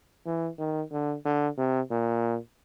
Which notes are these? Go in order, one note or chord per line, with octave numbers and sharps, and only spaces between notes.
E3
D#3
D3
D3
C3
A#2